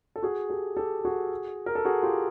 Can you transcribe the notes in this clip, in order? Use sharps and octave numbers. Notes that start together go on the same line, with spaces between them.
A4
F#4 G#4
G4 A4
G4 A4
F#4 G#4
A#4
A4
F#4 G#4
F4 G4